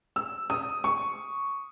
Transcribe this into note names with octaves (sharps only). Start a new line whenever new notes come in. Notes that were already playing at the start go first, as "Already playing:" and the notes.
E6
D#6
C#6